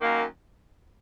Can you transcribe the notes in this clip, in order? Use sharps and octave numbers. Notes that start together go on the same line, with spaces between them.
F#2 D#3 A#3